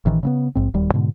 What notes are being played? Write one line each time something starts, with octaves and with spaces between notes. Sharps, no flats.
A1 D#3 E3
C#3 A#3 B3
A#1 G#2 C4
D1 D#2 G3
G#2 B2 D3